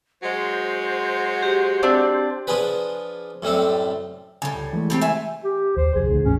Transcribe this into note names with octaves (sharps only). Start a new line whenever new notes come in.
F#3 G#3 F#4 C5
G4
C4 D4
F3 D4 F4 G#4 B4
F#2 A2 G3 A3 C4
A2 C#3 G3 G#5
C#2
E3 G#3 A3
G3 C4 G4
E5 G#5
G4
D#2 C5
C2 F2 G#4
D2 A3
G#1 E2 A2 C#4